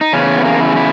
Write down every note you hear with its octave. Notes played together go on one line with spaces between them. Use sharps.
D#4
E2 C#3 C#4
B3
A#3
E4
E4